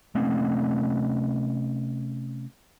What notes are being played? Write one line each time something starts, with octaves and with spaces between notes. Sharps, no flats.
C3 A3 C4 C#4